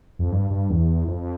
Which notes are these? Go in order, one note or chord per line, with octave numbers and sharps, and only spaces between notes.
F2
G2
G2
E2
F2